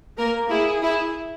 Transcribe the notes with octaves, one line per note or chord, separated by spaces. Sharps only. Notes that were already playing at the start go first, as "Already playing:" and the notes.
A#3 A#4
E4 G#4
E4